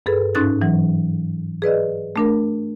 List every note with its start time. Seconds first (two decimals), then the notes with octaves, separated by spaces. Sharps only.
0.06 G2 G#4 A4 B4
0.35 G#2 C#4 D#4 F#6 A6
0.61 E3 F#3
1.62 G#4 B4 D5 D#5
2.16 A3 D4 A#4